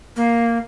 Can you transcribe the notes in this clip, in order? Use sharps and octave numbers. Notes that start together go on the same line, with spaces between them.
A#3